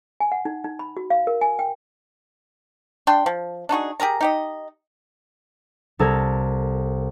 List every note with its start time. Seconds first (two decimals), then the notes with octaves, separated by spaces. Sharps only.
0.20 G#5
0.32 F#5
0.45 D#4
0.64 D#4
0.79 B5
0.97 F#4
1.10 F5
1.27 A#4
1.41 G#5
1.59 G5
3.07 D4 G5 C6
3.26 F3
3.69 D4 D#4 F#4 G#4
4.00 G4 G#4 A#4 A#5
4.21 D#4 G4 D#5
5.99 C2 A4 A#4 G#6